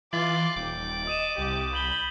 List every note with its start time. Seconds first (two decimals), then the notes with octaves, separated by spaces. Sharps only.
0.13 E3 F4 D6 A6 F#7
0.56 D#1 G5 D6
1.07 D#5 D#6 D#7 E7
1.38 C2 G4
1.74 B5 G6 F#7 G7